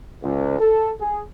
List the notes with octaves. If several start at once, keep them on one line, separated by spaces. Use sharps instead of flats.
C#2
A4
G#4